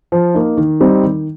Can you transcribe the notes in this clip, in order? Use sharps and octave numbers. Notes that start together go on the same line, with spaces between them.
F3
A#3 D#4
D#3
G3 C4 D#4
D#3